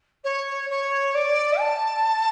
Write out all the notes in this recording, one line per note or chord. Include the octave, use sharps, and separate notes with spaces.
C#5
C#5
D5
A5